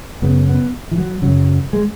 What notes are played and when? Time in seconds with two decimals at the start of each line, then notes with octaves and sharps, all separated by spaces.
0.22 F#2 C#3 B3
0.48 B3
0.91 E3
0.98 F#3
1.22 F#2 C#3 F#3
1.73 G#3